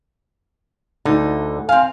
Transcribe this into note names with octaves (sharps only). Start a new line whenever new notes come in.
D2 D3 D#4
C4 F5 G#5